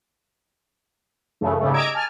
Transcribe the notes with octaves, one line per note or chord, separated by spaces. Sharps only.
F#2 C#3 E3 A3
G#2 C#3 G3 A3
D#5 A#5 D6 E6 G#6 D7
G#5 A5 F6